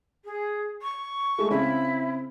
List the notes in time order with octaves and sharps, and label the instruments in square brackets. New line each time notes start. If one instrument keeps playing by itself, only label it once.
[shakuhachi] G#4
C#6
[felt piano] G#3 A3
[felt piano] C#3 C4 C#4 [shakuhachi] E4